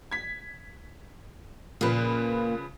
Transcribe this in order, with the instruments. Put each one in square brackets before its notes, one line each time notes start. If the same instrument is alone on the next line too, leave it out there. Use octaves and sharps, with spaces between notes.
[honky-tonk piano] G#6 B6
[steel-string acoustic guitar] A#2 A#3 [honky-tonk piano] C#3 F3 B4